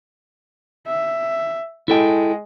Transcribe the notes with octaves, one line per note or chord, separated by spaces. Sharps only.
E5
G#3 E4 A4 G5